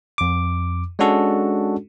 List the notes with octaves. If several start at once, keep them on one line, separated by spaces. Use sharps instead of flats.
F2 D6
G#3 C#4 D4 F#4 A4